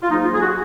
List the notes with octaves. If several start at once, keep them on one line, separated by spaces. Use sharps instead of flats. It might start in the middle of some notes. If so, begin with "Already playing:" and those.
F4
G#2 F#3 A#3 D#4
F4
G#4
F#4